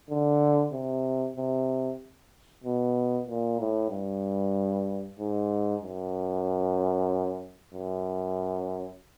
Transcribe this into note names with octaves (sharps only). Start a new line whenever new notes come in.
D3
C3
C3
B2
A#2
A2
G2
G#2
F#2
F#2